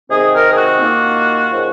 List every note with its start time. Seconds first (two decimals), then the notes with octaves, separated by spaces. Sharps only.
0.09 C3 D#3 G#3 C4 D#4 G#4
0.33 A#4
0.52 G#4
0.57 F#4
0.80 D#2 D#3 A#3 F4
1.51 C#3 F3